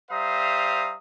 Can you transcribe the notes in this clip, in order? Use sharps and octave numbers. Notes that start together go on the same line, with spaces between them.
G3 C5 E5 F5 A#5 D#6